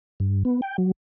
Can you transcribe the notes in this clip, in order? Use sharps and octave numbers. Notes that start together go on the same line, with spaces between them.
G2
B3
G5
F#3